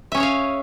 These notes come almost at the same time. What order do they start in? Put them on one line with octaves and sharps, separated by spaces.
E5 C#4 G#4 C#5 F5